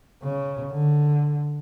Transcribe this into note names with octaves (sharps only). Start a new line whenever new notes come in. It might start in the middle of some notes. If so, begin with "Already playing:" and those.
C#3
D3